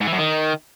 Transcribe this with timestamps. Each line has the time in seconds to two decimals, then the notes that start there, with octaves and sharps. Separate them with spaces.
0.01 G#2
0.06 E3
0.12 F#2
0.18 D#3